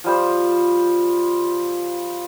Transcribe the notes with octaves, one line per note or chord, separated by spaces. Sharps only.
F3 G3 C5